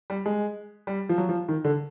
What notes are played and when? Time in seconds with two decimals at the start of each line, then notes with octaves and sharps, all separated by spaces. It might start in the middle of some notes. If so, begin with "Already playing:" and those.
0.10 G3
0.26 G#3
0.87 G3
1.09 F3
1.18 F#3
1.29 F3
1.49 D#3
1.65 D3